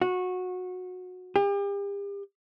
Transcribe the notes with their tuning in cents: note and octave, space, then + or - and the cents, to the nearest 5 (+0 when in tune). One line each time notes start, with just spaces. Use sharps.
F#4 -20
G4 +40